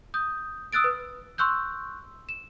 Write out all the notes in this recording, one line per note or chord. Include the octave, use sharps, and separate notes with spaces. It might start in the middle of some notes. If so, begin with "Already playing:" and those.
D#6 G6
D#6 E6 F#6 A6 D7
B4
C6 C#6 E6 F#6 G6
E7